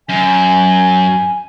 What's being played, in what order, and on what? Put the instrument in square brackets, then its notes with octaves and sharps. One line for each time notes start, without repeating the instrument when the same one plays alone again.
[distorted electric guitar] F#2 [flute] G#5